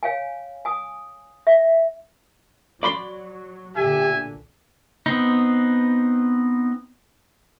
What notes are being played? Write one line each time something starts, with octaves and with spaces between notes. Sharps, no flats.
C#5 F5 G5 G#5
G#5 D#6
E5
F#3 D5 B5 C6
B1 A#2 D3 G4 E5 G#5
B3 C4 D#4